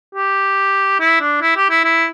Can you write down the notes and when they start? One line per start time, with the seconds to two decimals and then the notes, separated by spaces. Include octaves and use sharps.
0.15 G4
1.00 E4
1.21 D4
1.41 E4
1.56 G4
1.70 E4
1.84 E4